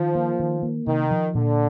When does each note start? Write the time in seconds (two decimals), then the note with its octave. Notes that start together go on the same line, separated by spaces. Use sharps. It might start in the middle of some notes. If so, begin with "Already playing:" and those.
Already playing: D#3 F3
0.15 A#3
0.40 D#3
0.62 A#3
0.87 C3 D#3
1.11 F3
1.35 A#2 D3